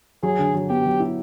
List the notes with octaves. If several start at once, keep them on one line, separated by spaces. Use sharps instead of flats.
F#3 G#4
D3
F#3
B3 G4
F#3
E4